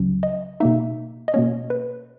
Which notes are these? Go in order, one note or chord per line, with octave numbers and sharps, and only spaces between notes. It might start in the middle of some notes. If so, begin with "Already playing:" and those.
Already playing: C#2 C#3 F#3 C#4
D#5
B2 A#3 D#4 E5
D#5
B2 A#3 C#4 C#5
B4